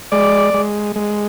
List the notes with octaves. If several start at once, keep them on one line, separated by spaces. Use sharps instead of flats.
G#3 D5
G#3
G#3